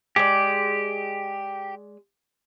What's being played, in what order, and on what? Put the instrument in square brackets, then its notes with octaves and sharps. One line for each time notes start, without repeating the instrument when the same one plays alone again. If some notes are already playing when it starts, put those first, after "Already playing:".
[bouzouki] G#3 D5 [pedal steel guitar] G4